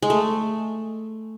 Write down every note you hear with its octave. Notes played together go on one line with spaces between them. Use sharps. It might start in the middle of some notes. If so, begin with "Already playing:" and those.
G#3
A3